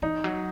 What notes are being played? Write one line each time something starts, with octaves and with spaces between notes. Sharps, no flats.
E3 D#4
F#3